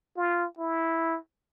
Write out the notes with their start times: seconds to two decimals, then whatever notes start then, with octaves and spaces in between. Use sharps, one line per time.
0.17 F4
0.58 E4